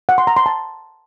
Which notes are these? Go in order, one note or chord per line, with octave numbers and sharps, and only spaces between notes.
F#5
C6
A#5
C6
A5